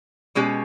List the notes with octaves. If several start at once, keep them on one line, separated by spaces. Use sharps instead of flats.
B2 G#3 C#4 G4